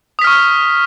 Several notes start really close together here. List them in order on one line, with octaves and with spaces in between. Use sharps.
D#6 B6 F6 C#6